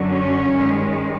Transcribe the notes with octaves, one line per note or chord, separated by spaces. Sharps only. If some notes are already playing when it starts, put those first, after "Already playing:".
Already playing: F#2 D3 F#3
C#4
G2 D#3 G#3